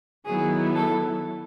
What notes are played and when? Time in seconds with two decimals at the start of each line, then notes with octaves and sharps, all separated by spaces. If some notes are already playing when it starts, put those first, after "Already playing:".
0.26 D#3 F#3 B3 E4 G#4
0.75 A4